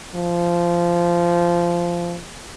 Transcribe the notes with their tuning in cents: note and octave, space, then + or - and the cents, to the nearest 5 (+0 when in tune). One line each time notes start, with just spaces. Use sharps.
F3 -15